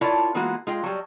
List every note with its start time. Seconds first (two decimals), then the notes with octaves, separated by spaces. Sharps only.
0.01 E4 F4 A#4 C#5 D5 A5
0.35 E3 G#3 A#3 B3 F4 F#4
0.67 G#3 F4 G5
0.83 F#3 G3